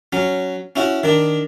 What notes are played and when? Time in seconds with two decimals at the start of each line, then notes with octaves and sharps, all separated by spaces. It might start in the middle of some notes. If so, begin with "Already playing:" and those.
0.13 F#3 C#4
0.76 C#4 E4 F#4
1.04 D#3 D4